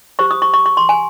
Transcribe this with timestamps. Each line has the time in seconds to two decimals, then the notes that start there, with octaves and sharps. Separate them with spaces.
0.19 G4 C5 C#6
0.31 D#6
0.42 C#6
0.54 C#6
0.66 C#6
0.77 C6
0.89 G#5